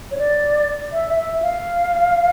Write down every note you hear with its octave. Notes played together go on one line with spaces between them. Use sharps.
C#5
D5
E5
E5
F5